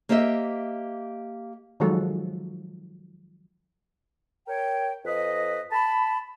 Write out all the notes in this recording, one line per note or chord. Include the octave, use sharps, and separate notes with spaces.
A#3 G4 C5 D#5 E5
D#3 F3 F#3 G#3 F#4 A4
A#4 C#5 G5
F2 B4 D#5
A5 B5